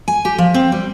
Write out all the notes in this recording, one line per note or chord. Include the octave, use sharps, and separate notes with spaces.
G#5
G4
F3
C4
G3